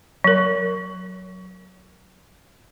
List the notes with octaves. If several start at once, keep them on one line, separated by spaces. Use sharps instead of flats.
F#3 A#4